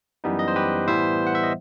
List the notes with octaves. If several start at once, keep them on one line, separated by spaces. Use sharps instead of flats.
F#2 E3 G3 B3 D#4
D#5
C5
G4 B4
A2 E3 G3 B3 E4 C5 E5
F#5
E5
D#5